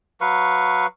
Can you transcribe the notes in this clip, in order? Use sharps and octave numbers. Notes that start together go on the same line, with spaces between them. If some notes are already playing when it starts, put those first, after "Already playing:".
F#3 B4 F5 C#6